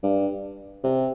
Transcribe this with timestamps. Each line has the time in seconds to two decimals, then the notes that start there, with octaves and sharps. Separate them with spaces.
0.03 G2
0.84 C3